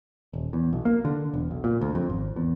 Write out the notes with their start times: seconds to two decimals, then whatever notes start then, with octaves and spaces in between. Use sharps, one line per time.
0.33 D#1
0.53 E2
0.73 B1
0.85 A#3
1.05 D3
1.34 E1
1.51 B1
1.64 A#2
1.81 D2
1.95 F2
2.10 G#1
2.36 E2